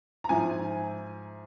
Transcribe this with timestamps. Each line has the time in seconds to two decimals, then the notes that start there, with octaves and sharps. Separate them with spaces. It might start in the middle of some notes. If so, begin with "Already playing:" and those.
0.24 A#5
0.29 G#2 F3 C4 E4 G#5